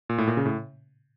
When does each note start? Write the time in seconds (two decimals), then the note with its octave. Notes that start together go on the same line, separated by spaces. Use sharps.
0.09 A#2
0.18 A2
0.28 A#2
0.37 C#3
0.46 A2